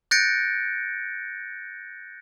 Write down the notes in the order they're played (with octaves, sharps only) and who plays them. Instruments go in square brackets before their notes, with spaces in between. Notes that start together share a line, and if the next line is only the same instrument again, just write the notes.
[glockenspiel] F#6 G6 A6 A#6 C#7 D7